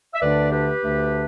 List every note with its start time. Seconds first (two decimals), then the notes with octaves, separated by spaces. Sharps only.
0.13 E5
0.21 D2 D3 A3 D4 B4 D5
0.51 G4 B4
0.82 D2 D3 A3 D4